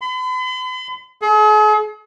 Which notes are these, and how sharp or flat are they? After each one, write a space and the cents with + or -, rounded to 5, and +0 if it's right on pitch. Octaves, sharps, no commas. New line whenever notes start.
B5 +45
G#4 +45